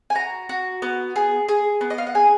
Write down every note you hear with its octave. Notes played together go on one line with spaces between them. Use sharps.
G#5
F#4 A#5
F#4
B3
G#4
G#4
B3
D#5
F5
F#5
G#4 G#5